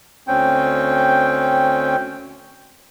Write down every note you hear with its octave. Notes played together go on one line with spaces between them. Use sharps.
D2 C4 C#4 G5